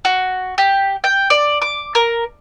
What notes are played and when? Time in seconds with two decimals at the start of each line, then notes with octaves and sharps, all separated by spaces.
0.05 F#4
0.58 G4
1.04 G5
1.30 D5
1.62 D6
1.95 A#4